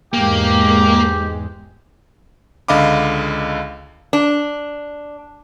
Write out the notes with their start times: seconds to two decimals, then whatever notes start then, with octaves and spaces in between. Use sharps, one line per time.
0.14 E2 G#2 G#3 A#3 G4
2.68 C#2 D3 D#5 F5 B5 D6
4.13 D4